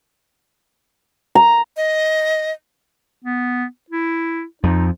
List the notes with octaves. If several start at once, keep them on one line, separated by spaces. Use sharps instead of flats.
A#5
D#5
B3
E4
F2 F3 D#4